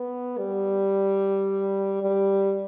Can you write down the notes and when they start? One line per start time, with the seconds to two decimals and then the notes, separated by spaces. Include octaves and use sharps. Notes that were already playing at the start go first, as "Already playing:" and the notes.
Already playing: B3
0.38 G3
2.03 G3